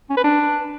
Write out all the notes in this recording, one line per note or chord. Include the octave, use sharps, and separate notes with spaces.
C#4
B4
D4